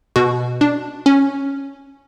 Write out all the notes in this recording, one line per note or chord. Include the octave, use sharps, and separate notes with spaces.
B2 F#4
D4
C#4